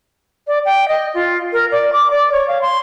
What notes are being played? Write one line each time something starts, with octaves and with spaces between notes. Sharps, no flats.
D5
G5
D#5
F4
A#4
D5
D6
D5
C#5
F5
C6